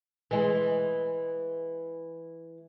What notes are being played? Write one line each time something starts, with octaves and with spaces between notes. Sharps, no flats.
E3 G#3